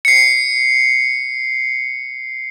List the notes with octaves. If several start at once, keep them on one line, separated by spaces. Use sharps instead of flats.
C7 C#7